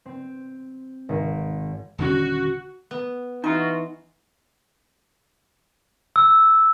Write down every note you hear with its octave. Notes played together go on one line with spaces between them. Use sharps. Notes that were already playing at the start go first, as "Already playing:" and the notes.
C4
G#1
D#1 D3 C#4 F#4
B3
E3 D#4 F4 F#4
E6